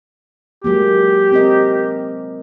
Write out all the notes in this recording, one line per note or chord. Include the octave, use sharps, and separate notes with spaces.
F#3 G#3 A#3 G4
C4 A#4 D#5